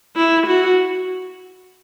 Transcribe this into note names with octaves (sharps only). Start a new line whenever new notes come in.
E4
F#4